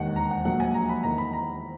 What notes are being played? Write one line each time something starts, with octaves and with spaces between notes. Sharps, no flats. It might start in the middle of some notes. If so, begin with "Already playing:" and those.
Already playing: E1 D#2 D#3 A#3 F#5
A#5
F#5
A#1 A#2 F#3 A#3 F#5
G#5
A#5
B5
E2 D#3 A#3 A#5
B5
A#5